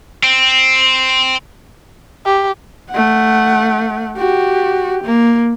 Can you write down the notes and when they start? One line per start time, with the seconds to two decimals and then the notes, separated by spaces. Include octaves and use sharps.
0.23 C4
2.26 G4
2.91 A3 F#5
4.17 F#4 G4
5.04 A#3